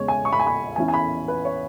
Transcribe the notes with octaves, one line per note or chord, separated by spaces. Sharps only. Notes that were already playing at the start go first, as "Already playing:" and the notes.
Already playing: E2 C#3 G#3 C#5
G#5
C#6
B5
G#5
B5
E2 E3 C#4 E4 G#5
G#5
B5
B4
C#5